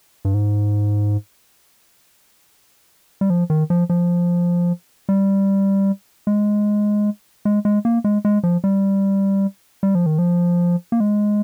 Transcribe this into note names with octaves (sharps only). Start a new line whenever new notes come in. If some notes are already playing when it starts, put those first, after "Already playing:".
G2
G#2
G3
F3
D#3
F3
F3
G3
G#3
G#3
G#3
A#3
G#3
G#3
F3
G3
G3
F3
D#3
F3
A#3
G#3